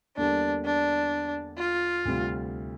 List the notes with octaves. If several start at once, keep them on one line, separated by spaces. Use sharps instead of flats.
E2 D3 G3 A#3 D4
D4
F4
D2 C3 G3